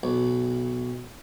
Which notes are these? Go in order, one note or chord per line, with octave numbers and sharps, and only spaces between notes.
B1